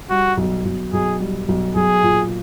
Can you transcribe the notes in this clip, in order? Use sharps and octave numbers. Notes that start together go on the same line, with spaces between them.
G3 F#4
B1
B1
B1 G#4
G3
B1
B1 G#4
A#2